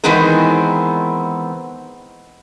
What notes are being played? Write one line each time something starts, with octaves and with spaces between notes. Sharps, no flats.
D#3 E3 G#3 B3 C4 A#4